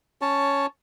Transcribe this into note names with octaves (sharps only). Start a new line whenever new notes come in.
C#4 C#5 A5